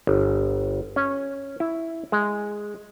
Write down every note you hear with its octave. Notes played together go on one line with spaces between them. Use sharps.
G1
C#4
E4
G#3